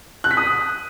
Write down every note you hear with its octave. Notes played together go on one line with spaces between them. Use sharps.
F#6
B6
D#6